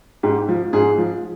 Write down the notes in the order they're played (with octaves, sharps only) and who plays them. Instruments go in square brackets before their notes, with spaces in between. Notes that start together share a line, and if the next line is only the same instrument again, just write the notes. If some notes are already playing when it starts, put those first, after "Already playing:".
[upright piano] G#2 G4
F3
G#2 G#4
F3